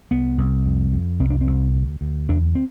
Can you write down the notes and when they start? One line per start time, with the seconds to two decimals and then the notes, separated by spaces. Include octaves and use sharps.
0.11 C2 B3
0.38 C2
0.65 F2
0.92 F2
1.20 C2 C4
1.30 D4
1.41 C4
1.47 C2
1.74 D2
2.01 D2
2.29 E2 D4
2.55 C4